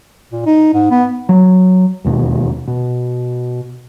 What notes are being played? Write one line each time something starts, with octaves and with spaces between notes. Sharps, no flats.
A#2
D#4
G#2
B3
F#3
E1 D#2 B2
B2